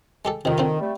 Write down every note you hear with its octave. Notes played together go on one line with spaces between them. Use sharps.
G#3 G4 A4
F2 C3 D#3
D3 C4 F4
G3 A3